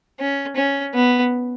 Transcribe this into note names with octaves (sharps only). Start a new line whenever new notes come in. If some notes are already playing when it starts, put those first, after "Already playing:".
C#4
C#4
B3